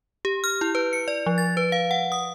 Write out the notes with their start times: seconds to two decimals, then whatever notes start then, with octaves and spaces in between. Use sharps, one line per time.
0.25 G4
0.44 F6
0.61 E4
0.75 B4
0.93 C#7
1.08 D5
1.26 F3
1.38 A6
1.57 B4
1.72 F5
1.91 F#5
2.12 D#6